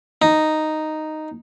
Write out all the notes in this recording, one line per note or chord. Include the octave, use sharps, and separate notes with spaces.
D#4